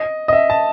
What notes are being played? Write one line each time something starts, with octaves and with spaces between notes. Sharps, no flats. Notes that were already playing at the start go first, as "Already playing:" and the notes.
Already playing: D#5
D#5
E5
A5